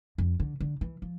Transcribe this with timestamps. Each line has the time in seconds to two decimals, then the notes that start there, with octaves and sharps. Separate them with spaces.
0.18 F2
0.40 D3
0.60 D3
0.81 E3
1.02 F3